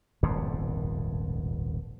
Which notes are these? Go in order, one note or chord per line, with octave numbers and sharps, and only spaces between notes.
D#1 G#1 F2 B2